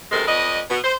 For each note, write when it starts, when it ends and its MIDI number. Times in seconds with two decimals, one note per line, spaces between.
0.11 0.26 42
0.11 0.26 48
0.11 0.26 51
0.11 0.26 56
0.11 0.26 69
0.11 0.26 70
0.27 0.60 41
0.27 0.60 71
0.27 0.60 74
0.27 0.60 75
0.70 0.78 47
0.70 0.78 59
0.83 0.93 72